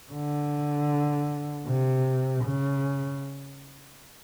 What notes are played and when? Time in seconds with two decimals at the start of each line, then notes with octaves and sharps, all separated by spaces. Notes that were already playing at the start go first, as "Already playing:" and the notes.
0.13 D3
1.67 C3
2.44 C#3